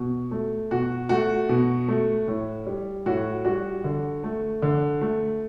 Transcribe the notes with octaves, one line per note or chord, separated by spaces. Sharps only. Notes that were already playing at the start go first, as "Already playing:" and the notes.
Already playing: B2
A3
B2 F#4
A3 F#4
B2
A3
A2
G3
A2 F#4
G3 F#4
D3
A3
D3
A3